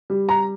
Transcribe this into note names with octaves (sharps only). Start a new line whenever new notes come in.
G3
A#5